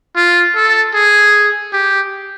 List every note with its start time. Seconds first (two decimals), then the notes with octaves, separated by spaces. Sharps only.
0.16 F4
0.56 A4
0.94 G#4
1.73 G4